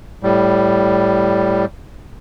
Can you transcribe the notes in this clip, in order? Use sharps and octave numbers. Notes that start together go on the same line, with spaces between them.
A2 G3